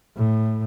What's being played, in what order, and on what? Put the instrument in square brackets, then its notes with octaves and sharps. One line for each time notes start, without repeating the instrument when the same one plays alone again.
[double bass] A2